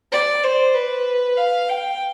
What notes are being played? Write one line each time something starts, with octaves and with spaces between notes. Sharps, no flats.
D5
C5
B4
F5
G5